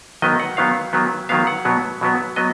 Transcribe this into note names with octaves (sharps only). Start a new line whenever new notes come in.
D#3 F#3 B3 D#5
F#5
D#3 F#3 B3 F5
D#3 F#3 B3
D#3 F#3 B3 F5
F#5
B2 F#3 B3
B2 F#3 B3
F#3 B3 D#5